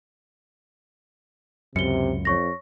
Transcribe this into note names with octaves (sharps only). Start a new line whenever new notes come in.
C#2 F#2 C3 C#7 G7
F2 C#5 C#6 A#6